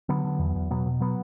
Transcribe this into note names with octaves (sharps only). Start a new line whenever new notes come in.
D3 F#3 B3
D3
E2
E2
B2 F#3 B3
B2
F#3 B3